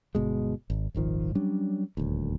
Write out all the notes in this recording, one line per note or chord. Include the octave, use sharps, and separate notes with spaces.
G1 B2 G#3
G#1
D#1 G#1 D#3 F3
F#3 G3 C#4 D4
D#1 D2